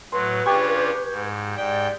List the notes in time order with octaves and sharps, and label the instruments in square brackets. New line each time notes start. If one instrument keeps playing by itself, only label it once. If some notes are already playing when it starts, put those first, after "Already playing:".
[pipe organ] A2 F#3 [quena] B4 [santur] C6
[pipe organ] C#3 D4 F4 [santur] G4 G#5 C#6
[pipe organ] G#2
[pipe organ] G#2 G5 [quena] D5